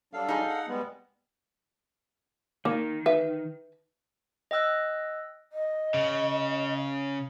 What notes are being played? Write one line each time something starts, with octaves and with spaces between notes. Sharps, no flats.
F#3 G3 D4 A4 F5
D#4 G#4
F#5
G3 G#3 B3
D#3 A#3
B4 E5
D#5 G5 E6 F#6
D#5
C#3